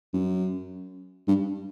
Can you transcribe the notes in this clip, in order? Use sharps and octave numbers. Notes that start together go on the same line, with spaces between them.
F#2
G2